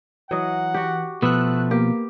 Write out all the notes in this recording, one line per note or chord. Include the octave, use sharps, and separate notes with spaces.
E3 F#3 D#5 F#5
F#4 G4
B2 F3 A3 B3 E6 F#6
A#3 G4